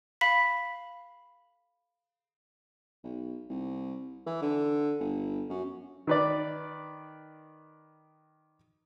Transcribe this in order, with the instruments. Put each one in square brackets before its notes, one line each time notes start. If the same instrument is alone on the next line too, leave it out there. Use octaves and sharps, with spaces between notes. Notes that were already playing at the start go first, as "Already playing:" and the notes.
[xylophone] F5 B5 B6
[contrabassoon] B1
C2
E3
D3
G1
F#2
[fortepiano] D#3 B4 D5